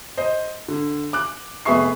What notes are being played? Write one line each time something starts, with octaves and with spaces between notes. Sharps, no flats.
C5 D#5
D3
D6 F#6
F1 B3 G#4 E5 C#6 C7